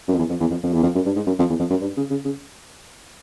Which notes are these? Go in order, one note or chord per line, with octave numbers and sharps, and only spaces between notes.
F#2
F2
E2
F2
E2
F2
F2
E2
F2
F#2
G2
G#2
F#2
F2
E2
F2
F#2
G2
C#3
C#3
C#3